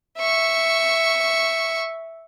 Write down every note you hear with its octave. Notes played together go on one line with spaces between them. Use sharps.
E5 C#6